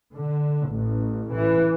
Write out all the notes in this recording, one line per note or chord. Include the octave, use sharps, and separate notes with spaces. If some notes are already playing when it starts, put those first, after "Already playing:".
D3
A1
E3